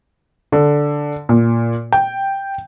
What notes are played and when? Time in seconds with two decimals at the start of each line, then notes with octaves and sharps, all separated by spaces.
0.52 D3
1.29 A#2
1.93 G5